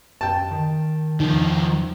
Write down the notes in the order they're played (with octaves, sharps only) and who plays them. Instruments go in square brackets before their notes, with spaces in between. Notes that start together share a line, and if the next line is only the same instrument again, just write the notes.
[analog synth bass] F#2 [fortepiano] G5 A5
[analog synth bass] D#3
[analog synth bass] E2 [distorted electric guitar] D#3 F3 [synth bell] D#4